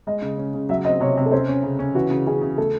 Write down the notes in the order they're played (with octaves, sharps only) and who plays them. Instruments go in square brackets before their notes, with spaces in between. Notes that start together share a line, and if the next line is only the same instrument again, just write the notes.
[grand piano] G#3 [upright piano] D#5
[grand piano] C#3
C#4
C#3
[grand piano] F#3 [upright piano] E5
[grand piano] C4 [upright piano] D#5
[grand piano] C3 [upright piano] C#5
[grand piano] C3
[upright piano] A4
[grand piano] C#4 [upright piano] C5
[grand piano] C#4
C#3
C#4
[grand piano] E3 [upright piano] F#4
[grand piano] C#3
[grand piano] C#3 [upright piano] G#4
[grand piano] C#3
[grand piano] A3 [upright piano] A4